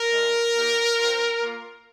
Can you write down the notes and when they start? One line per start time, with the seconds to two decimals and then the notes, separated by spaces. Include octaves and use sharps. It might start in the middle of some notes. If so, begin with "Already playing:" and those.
Already playing: A#4
0.10 G#3 D4 F4
0.54 A#3 D#4 G4
0.97 C4 F4
1.41 A#3 F4